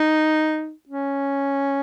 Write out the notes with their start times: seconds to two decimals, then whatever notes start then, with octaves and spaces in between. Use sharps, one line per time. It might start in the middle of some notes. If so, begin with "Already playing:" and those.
Already playing: D#4
0.88 C#4